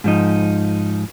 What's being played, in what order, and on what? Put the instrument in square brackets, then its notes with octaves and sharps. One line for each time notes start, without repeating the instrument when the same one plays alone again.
[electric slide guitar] G#2 F3 D#4